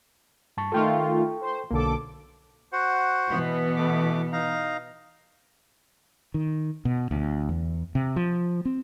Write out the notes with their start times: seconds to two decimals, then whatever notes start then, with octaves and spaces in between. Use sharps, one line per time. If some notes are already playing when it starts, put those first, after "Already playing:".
0.57 G2 A5 C#6
0.72 D#3 A3 F4 A4 G5 C#6
1.41 C5
1.71 B1 D3 A#3 A4 D6
2.73 F#4 C5 F#5
3.29 B2 E3 B3
3.77 A3 D6
4.32 D#4 F5 A#5
6.34 D#3
6.85 B2
7.11 D2
7.49 E2
7.95 C3
8.16 F3
8.65 C4